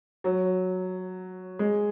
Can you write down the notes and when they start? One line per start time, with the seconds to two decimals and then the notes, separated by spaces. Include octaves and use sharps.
0.24 F#3
1.59 G#3